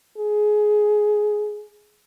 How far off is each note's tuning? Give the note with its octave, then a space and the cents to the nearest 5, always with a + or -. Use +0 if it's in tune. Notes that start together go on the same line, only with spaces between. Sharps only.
G#4 +15